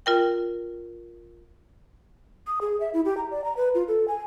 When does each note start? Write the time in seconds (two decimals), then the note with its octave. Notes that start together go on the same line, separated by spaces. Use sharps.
0.06 F4 A#4 G5
2.47 D#6
2.61 G#4
2.80 E5
2.94 E4
3.05 G4
3.17 A#5
3.31 D5
3.44 A#5
3.57 B4
3.75 F4
3.88 A4
4.08 G#5